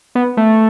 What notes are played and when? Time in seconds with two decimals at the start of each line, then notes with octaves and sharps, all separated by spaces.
0.15 B3
0.37 A3